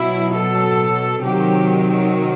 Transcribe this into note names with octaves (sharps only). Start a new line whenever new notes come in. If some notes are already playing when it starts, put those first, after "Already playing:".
Already playing: B2 F#3 E4
A4
C3 D#3 F#3 G4